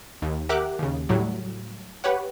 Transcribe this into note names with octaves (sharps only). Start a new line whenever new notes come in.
D#2
G4 A#4 E5 F#5 D6 F#6
D#2 C#3
A2 F#3 G3
G4 B4 C#5 F#5